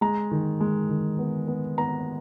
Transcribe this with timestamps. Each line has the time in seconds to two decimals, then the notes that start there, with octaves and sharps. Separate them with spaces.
0.01 G#3 A#5
0.31 D#3
0.61 G#3
0.89 D#3
1.18 B3
1.48 B3
1.78 B3 A#5